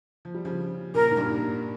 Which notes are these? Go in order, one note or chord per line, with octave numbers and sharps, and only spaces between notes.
F3
G3
C#3 F3
A#2 C#3 A#4
G#2
G2 A#2
G#2